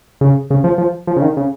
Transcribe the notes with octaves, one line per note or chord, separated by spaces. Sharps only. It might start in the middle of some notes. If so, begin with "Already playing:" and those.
C#3
C#3
F3
F3
F3
C#3
D#3
C#3